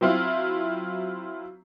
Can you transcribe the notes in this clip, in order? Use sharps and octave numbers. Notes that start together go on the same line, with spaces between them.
F#3 C4 E4 F4